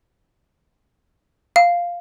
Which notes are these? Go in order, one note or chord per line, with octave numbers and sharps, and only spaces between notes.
F5